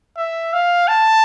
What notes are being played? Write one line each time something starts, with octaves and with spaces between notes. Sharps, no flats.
E5
F5
A5